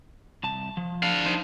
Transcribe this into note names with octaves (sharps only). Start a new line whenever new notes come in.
C2 A5
F3
D4 F5
D#4 C5